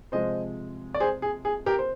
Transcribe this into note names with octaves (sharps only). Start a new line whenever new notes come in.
C3 F3 G#3 C5 D#5
D5
G#4 C5
G#4
G#4
G4 A#4
C5